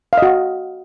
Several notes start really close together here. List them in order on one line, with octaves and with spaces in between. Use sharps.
F5 D#5 F#4